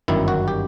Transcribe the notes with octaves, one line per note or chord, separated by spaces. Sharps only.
G1 F#2 D#3 E4
F#4
G4